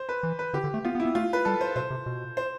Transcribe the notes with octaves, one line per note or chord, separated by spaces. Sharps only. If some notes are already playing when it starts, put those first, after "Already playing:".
Already playing: C5
B4
E3
B4
D3 G4
D3
A3
B3 F4
B3
E4
B3
A3 F4
B4
G3 A4
C5
B2 C5
C3
B2
C5